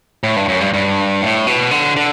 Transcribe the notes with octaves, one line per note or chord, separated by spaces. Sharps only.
A2
G2
F#2
G2
G2
A2
B2
D3
D3